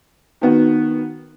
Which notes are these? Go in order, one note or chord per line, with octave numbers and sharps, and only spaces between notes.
D#3 B3 F#4